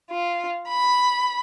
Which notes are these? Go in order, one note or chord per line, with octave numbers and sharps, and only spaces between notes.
F4
B5